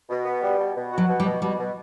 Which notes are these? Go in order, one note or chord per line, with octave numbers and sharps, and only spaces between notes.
B2
B3
G3
B2
B2
F#4
F#3
B2
G3
B2
B2 G3
B2